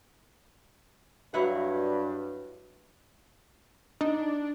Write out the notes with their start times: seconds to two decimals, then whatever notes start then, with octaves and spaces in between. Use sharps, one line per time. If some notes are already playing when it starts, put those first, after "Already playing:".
1.34 G2 F#3 E4 F#5
4.01 D4 D#4